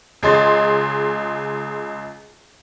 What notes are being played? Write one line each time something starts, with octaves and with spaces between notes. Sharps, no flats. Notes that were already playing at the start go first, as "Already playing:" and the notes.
C#2 G#4 D#5 C6 A6